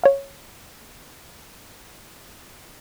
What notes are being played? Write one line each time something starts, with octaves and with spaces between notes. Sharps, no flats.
C#5 F5